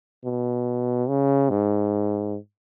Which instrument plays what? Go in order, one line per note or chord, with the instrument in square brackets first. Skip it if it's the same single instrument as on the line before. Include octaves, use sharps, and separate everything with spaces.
[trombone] B2
C#3
G#2